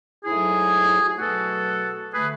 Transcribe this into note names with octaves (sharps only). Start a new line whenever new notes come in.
G#2 F#3 A3 E4 G#4
E4
F#4
G#4
B2 F#3 A3 F#4 A4
D3 A3 G#4 B4